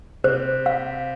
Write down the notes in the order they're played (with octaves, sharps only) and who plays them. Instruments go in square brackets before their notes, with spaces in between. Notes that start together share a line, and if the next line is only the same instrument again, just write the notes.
[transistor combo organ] C3 [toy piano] C5
[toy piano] F5